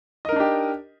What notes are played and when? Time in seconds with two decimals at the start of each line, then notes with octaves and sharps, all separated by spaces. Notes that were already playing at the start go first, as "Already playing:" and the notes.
0.25 D#5
0.29 A#4
0.32 D#4
0.36 D4
0.40 G4